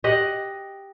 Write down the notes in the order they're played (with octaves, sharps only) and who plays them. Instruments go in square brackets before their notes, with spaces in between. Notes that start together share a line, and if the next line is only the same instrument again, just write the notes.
[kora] G4 D#5 F#5